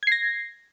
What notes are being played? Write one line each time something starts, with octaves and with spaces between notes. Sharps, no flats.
G#6 A#6 C7